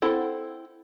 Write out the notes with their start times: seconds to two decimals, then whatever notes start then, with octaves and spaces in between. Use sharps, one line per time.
0.02 C4 E4 A4 F#5